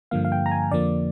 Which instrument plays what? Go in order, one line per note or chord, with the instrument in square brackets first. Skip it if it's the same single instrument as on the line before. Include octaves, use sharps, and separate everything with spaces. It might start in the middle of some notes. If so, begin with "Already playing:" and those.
[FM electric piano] G2 D3 F3 A#3 F5
F5
G5
A#5
G#5
F2 D3 F3 A#3 D5